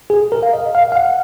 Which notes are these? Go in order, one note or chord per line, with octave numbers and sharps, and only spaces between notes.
G#4
A#4
F5
D#5
F5
F5
F#5